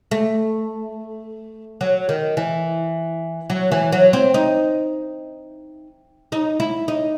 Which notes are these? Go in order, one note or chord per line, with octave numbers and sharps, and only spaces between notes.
A3
F#3
D#3
E3
F#3
E3
F#3
C4
D#4
D#4
E4
D#4